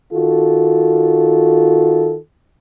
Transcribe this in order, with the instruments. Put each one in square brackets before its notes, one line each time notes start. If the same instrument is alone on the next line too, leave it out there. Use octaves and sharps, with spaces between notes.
[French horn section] D#3 F4 F#4 A4